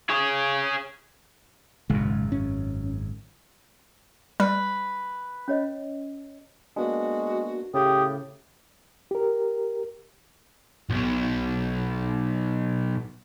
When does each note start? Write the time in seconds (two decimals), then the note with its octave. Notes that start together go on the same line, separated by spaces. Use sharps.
0.10 G#4 C#5
1.90 G#1 F#2 A#2 C#3 G#3
2.32 C#4
4.40 G3 B4
5.48 C#4 C#5 D#5
6.76 G#3 A#3 B3 D4 F#4
7.74 A2 C#3 G4 D#6
9.11 G4 A#4
10.90 B1 B2